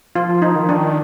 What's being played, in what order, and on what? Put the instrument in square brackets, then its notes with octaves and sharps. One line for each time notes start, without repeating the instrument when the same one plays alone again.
[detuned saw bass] F3 [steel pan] F4
[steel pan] D#4
[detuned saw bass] D#3
[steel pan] D4